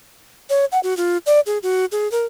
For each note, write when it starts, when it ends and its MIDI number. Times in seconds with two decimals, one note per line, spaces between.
0.50 0.65 73
0.72 0.80 78
0.83 0.96 66
0.97 1.18 65
1.26 1.40 74
1.46 1.58 68
1.63 1.85 66
1.92 2.10 68
2.12 2.25 70